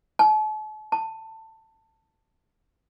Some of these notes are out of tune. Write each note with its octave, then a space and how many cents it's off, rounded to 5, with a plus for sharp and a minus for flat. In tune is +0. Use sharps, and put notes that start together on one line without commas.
A5 -40
A5 +20